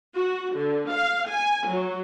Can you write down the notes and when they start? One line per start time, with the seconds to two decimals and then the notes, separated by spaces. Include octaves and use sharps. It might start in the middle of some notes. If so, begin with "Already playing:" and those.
0.15 F#4
0.54 D3
0.89 F5
1.27 G#5
1.66 F#3